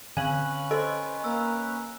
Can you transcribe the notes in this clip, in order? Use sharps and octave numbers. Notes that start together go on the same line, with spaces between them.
D3 C#4 B4 F5 G#5 F#7
A4 C5 D#5
A#3 E6